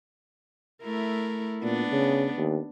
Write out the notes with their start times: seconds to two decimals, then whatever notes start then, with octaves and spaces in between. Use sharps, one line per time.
0.83 A3 E4 A#4
1.63 A#2 B3 D4
1.92 C#3
2.37 D#2